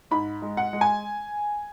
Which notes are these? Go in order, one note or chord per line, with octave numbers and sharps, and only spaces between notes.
G#2 B5
G#3
F#5
G#3
G#5